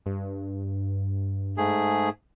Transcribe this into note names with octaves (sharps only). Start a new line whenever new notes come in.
G2
G#2 A3 G#4